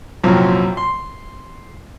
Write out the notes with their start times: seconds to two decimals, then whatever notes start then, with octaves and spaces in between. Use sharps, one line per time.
0.23 C2 F#2 A#2 F3 F#3 C4
0.77 C6